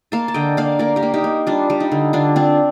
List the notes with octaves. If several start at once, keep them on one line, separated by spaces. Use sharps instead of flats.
A#3 F5 A5
A5
D3 D#5 G5
A#3 D5 F5
A#3 A#4 D5
G4 A#4
A#3
D#4 G4
A#3
G3 D4 F4
G3
D#4
D3
D3 D4 F4
C4 D4 F4